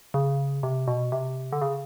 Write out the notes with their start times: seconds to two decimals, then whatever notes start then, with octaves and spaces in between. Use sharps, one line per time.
0.14 C#3
0.63 C3
0.87 B2
1.12 C3
1.52 D3
1.62 C#3